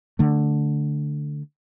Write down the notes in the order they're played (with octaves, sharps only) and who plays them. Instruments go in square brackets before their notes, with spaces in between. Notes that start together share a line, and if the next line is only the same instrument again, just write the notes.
[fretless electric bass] D3 A3